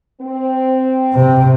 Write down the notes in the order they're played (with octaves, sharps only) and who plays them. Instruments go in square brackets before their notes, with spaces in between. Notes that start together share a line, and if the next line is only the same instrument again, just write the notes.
[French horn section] C4
[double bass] C3